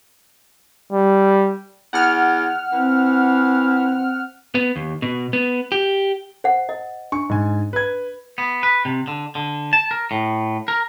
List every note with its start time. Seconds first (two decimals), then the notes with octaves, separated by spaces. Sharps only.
0.92 G3
1.93 E2 F#5 F6
2.72 E3 C4
4.55 B3
4.76 D#2
5.02 B2
5.33 B3
5.72 G4
6.44 C5 F#5
6.69 D#5
7.12 D4 C#6
7.29 G#2 G#5
7.73 B4 G#6
8.38 B3
8.63 B4
8.85 C3
9.08 D3
9.35 D3
9.73 A5
9.91 A#4
10.11 A2
10.68 A#4